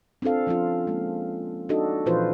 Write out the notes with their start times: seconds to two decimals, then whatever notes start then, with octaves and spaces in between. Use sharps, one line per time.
0.22 C4 D4 F4 A4 F5
0.47 F3 C4 C#4 F4
0.87 G#3 A#3
1.69 D4 D#4 F#4 A4 D#5
2.06 A#2 E3 F3 F4 B4 C5